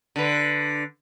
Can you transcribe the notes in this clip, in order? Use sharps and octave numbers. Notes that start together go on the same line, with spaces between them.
D3 B4